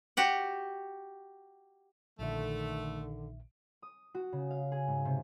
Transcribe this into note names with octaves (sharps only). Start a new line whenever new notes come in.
F#4 G4 F#5
A#1 A#2 D3 D#3 A3 E5
D#6
F#4
C#3
F5
G#4
G#2
C3